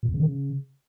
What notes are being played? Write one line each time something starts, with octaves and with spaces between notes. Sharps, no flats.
A#2
E2
C#3
D#3
C#3